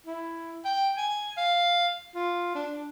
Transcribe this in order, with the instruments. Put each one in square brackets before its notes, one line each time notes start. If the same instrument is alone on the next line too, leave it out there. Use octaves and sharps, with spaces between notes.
[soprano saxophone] E4
G5
G#5
F5
F4
D4